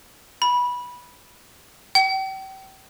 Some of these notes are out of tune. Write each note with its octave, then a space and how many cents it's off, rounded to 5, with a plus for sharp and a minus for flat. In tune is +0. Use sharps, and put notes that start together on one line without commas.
B5 -15
G5 -35